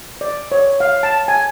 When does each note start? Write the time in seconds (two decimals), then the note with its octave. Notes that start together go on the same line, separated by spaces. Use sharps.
0.21 D5
0.52 C#5
0.80 F5
1.03 A5
1.28 G#5